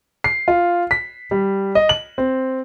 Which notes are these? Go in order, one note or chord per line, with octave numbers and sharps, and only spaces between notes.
C7
F4
B6
G3
D#5
F#7
C4